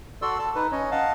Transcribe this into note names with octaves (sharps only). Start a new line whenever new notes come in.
F#4 A4 D5 C6 E6
A4 A5
D#4 B4
C#4 C#5 D#5
D#5 F5 F#5 A5